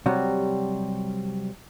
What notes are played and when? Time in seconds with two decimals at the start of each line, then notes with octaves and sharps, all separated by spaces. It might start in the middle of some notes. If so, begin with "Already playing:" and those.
0.06 C3 F#3 G3 F#4